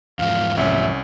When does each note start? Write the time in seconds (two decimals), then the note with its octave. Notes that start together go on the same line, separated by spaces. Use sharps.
0.19 E2 G#2 F3 F5
0.57 C2 C#4 E5